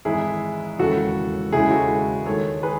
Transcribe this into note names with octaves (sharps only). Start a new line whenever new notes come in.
G#1 G#2 E3 G#3 E4 G#4
E1 D#2 C#3 E3 F#4 A4
E1 D#2 C#3 G#3 E4 G#4
F#4 A4
D#2 D#3 G#3 A4 C#5
G#4 B4